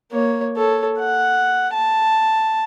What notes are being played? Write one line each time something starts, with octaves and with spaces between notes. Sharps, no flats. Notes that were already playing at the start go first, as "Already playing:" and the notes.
A#3 C#5
A4 C#5
F#5
A5